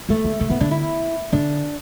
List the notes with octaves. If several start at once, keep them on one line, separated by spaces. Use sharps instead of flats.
E3 A3
D3
D3 A3
E3 B3
D3 D4
E4
D3 D4